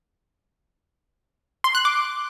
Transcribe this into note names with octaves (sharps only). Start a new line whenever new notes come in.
C6
F#6
D6